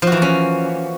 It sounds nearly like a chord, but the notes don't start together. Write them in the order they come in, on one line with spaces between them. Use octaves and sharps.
F3 F#4 E3 A#3 C#4